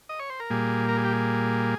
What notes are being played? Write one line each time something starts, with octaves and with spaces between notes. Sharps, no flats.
D#5
C#5
C5
A#4
A#2 G3 A#3 G#4
A#4
G#4
G4
G#4